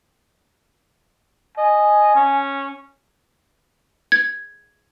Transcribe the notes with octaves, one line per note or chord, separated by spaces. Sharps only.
D#5 G#5
C#4
G#6